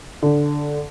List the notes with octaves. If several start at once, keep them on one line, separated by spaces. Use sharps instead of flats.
D3